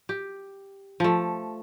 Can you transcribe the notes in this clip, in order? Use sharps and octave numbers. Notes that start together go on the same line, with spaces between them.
G4
F3 A3